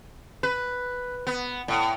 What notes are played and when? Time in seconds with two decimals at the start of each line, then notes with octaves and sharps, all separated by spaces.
0.43 B4
1.27 B3
1.68 A2